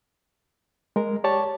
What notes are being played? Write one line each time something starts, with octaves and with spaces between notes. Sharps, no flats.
G#3 A#4
G4 C#5 D5 A5